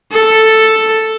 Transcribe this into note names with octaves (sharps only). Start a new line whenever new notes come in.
A4